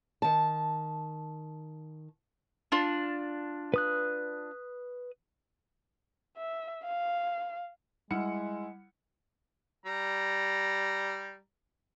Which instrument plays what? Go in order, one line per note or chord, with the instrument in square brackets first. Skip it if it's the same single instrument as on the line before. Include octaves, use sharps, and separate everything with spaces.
[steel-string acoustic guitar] D#3 A5
[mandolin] D4 F4
[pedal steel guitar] B4 D#6 F#6
[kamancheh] E5
F5
[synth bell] G3 [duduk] G#3 [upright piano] E4 F#5 C#7
[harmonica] G3 A#5